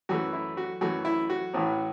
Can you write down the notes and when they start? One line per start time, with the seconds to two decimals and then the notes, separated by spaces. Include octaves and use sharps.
0.09 F#2 E3 A3 F#4
0.33 E4
0.57 F#4
0.81 F#2 E3 A3 F#4
1.05 E4
1.30 F#4
1.54 A1 A2 E3